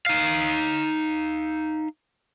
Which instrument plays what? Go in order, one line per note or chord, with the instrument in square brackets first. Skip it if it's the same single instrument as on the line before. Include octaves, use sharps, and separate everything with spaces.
[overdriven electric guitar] D#4 F5